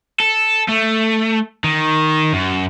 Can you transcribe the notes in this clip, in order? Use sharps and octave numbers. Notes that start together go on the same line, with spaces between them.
A4
A3
D#3
F#2